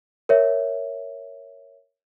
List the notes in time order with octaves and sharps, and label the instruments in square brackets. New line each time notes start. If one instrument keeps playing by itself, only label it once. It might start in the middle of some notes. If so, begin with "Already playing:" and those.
[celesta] A#4 C#5 E5